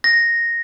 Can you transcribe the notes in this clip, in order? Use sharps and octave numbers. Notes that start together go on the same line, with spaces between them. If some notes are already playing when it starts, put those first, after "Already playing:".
A#6